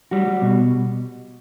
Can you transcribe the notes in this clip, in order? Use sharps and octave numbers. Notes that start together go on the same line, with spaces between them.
G3 F#4
G3
B2